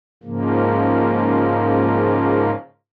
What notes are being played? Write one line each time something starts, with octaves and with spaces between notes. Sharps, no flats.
G#2 C#3 F3 A#3